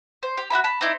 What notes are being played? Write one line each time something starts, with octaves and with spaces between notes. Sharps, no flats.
C5
G4
F#4 G4 E5 B5
A5 B5
C4 D#4 E4 D5